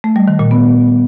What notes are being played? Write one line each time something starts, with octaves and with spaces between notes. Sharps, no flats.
A3
G3
D#3
A#2
B3